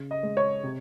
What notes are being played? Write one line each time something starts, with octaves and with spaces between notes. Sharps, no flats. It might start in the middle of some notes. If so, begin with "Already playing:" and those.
Already playing: C#3
D#5
G#3
C#5
C3